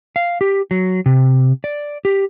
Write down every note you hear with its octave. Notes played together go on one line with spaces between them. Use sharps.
F5
G4
F#3
C3
D5
G4